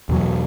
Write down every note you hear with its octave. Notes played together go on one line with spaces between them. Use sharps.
E2 B2 F#3